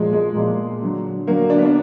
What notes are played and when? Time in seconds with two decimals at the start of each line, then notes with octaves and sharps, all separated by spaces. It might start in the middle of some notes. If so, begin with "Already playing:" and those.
Already playing: A#2 F3 G#3
0.13 G#3
0.35 A#2 F3 G#3
0.82 D3 F#3
1.27 D3 F#3 A#3
1.50 D4
1.58 B3
1.65 D4